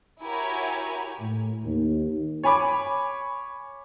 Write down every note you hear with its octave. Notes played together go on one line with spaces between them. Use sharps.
E4 F#4 G4 A#4 C#5 G#5
A2
D#2
C#5 G#5 B5 D6